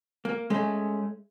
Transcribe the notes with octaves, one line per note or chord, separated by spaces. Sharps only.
A#3
G#3 A3 C#4